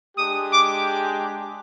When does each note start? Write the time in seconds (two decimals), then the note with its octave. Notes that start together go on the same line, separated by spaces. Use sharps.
0.16 G#3 D4 G4 D#6
0.50 D6